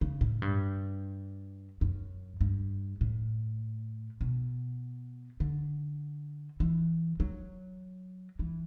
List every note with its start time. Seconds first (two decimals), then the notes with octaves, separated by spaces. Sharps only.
0.01 C#3
0.21 A2
0.42 G2
1.81 F#2
2.41 G2
3.01 A2
4.21 B2
5.40 D3
6.60 E3
7.20 F#3
8.39 E3